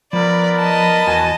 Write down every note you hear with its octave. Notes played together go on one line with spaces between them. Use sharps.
F3 B3 A#4 D5 B5
D#5 A5
E2 F#4 G#5